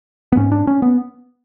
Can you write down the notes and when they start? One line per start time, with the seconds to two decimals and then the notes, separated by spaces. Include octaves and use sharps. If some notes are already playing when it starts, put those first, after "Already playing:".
0.32 B3
0.37 G#2 C#4
0.52 D4
0.67 C#4
0.82 B3